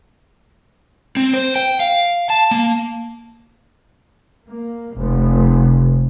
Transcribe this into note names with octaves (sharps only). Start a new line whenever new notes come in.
C4
C5
G5
F5
A5
A#3
A#3
F1